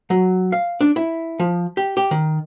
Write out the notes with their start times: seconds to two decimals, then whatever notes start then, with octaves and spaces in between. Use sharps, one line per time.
0.10 F#3
0.52 F5
0.81 D4
0.96 E4
1.40 F3
1.77 G4
1.97 G4
2.11 D#3